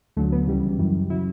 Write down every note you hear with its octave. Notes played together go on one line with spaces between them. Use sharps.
D2 D3 F#3 A3
B3
C#2 C#3 E3 G3
F#2 E3 G3
C#3 F#3 E4